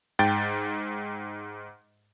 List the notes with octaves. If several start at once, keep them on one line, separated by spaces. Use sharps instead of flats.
G#2 G5 A6